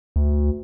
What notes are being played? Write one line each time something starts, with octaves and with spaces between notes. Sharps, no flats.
D2